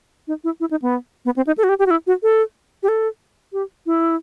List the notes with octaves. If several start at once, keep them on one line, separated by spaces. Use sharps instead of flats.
D#4
E4
E4
D#4
B3
B3
C4
D#4
A4
F#4
G4
G4
F#4
E4
F#4
A4
G4
A4
G4
E4